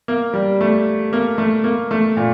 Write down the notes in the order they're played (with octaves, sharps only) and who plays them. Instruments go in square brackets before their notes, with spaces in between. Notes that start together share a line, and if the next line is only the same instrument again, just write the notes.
[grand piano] A#3
G3
A3
A#3
A3
A#3
A3
A#2